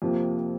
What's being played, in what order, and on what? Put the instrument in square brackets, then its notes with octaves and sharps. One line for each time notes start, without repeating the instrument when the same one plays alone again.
[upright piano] F2 C3 F3 A#3